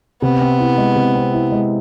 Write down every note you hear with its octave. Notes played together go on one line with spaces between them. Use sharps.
C3 B3
C4
E4
G#3
C3
C4
E4
G#3